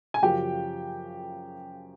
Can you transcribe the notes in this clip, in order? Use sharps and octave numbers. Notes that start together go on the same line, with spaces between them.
G#5
F#2 C#3 F3 G4 G5